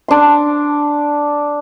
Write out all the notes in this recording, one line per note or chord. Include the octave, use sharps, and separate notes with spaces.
D4 C6